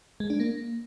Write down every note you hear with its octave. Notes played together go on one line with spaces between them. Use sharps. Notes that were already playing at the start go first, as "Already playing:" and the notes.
G#3
D4
A#3